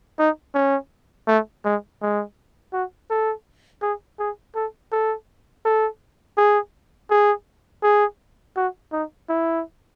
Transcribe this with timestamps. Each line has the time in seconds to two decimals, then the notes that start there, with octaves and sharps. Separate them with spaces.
0.19 D#4
0.55 C#4
1.28 A3
1.65 G#3
2.01 G#3
2.73 F#4
3.10 A4
3.82 G#4
4.19 G#4
4.55 A4
4.92 A4
5.65 A4
6.37 G#4
7.10 G#4
7.83 G#4
8.56 F#4
8.92 D#4
9.29 E4